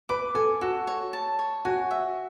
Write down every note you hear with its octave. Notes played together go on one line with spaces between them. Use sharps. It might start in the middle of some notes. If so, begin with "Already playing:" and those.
B4 D6
A4 G#5
F#4 A4
C#5
A5
C#5
F#4 G#5
E5